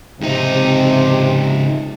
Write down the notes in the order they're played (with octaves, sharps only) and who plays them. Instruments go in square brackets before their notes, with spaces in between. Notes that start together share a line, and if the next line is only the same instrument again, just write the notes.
[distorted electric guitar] C#2 D#4 [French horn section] C3